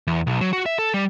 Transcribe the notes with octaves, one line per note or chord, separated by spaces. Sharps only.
E2
B1
F#3
F#4
E5
A4
G3